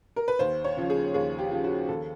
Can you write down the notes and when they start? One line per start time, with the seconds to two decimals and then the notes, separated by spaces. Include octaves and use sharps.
0.16 A#4
0.28 B4
0.39 D#2 C5
0.65 C#5
0.77 C#3 F3
0.90 G#4
1.14 D#2 G#4
1.39 G4
1.51 C#3 F3
1.64 F#4
1.89 D#2 A4